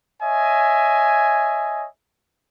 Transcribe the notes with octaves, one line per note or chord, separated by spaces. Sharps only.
C#5 D#5 E5 G#5